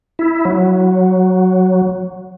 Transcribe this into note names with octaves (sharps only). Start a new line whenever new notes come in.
E4
F#3